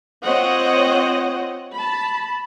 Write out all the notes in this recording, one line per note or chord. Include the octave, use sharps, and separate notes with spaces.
C4 F4 C5 C#5 D#5 F#5
A5 B5